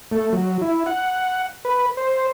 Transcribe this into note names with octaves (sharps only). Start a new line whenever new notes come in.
A3
F#3
E4
F#5
B4
C5